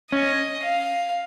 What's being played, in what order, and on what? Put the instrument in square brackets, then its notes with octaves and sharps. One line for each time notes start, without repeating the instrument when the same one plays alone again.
[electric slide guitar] C#4 [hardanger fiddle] D#5
[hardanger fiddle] F5